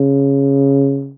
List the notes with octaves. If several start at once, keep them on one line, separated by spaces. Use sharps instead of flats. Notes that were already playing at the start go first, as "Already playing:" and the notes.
Already playing: C#3